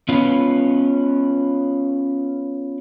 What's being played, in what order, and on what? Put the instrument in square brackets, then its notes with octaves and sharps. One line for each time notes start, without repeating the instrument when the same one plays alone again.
[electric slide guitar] B3 C#4 F4 B4